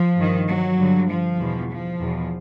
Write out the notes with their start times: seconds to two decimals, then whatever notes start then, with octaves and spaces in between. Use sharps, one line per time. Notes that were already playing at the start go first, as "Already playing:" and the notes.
Already playing: F3
0.16 G2 D#3
0.47 F#3
0.77 G2 D3
1.08 F3
1.38 E2 B2
1.70 F3
2.00 E2 B2